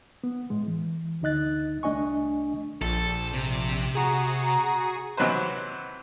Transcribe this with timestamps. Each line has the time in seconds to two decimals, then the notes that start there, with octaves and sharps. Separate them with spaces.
0.24 B3
0.50 A2 G#3
0.67 E3
1.21 D2 D3 D#4 D#5 F#6 A6
1.83 C2 A3 D4 D#5 G#5 C#6
2.81 A#1 A4
3.34 C3
3.95 F#4 G#4 A#5
5.17 C3 E3 F#3 D#4 B4 C5